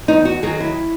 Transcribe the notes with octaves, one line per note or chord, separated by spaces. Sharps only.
E2 D#4
F#4
D#3 F#3 G#4
E4